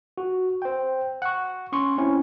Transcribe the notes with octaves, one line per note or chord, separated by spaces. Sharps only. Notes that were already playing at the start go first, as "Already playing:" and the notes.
F#4
C5 G5
F#5 C#6
C#4 C6 C#6
C4 C#4 E4